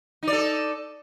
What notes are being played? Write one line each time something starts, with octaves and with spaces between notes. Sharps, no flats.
D#4 A4 D5